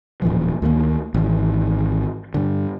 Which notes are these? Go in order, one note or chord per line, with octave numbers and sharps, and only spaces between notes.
D#1 A2 E3 F3
D2 D#3 F#3 A#3
G#1 E3
G2 D3